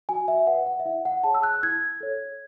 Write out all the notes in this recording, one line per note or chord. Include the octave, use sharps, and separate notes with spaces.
F#4 G#5
E5
B4 F#5
F#5
E5
E4 F#5
F#5
G#4 C#5 A5
E6
F#6
E4 G#6
A4 C#5